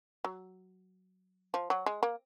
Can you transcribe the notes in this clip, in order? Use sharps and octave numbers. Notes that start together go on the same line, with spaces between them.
F#3
F3
F#3
G#3
A#3